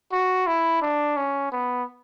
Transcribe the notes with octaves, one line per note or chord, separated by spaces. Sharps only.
F#4
E4
D4
C#4
B3